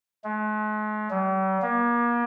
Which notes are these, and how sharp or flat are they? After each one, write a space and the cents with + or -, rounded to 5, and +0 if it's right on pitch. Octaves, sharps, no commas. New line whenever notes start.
G#3 +45
G3 -45
A#3 +35